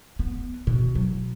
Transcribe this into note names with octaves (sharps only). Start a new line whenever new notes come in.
B3
B2
F#3